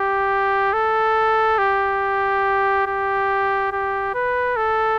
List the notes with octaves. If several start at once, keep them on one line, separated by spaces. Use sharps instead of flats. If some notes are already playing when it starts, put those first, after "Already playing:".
Already playing: G4
A4
G4
G4
G4
B4
A4